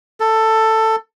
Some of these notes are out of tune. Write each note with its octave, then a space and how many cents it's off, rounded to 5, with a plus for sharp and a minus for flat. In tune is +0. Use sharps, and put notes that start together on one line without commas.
A4 +10